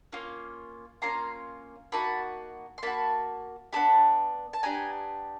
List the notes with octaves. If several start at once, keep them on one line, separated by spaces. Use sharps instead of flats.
A#3 C#4 F4
A#3 C#4 F4 A#5 C6
A#3 D#4 F#4 A5 B5
C6
A#3 D#4 F#4 A5 B5
B3 D4 G4 A5 B5
A5
B3 D4 G4 G#5 A#5